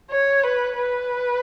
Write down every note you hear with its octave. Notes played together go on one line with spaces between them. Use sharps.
C#5
B4
B4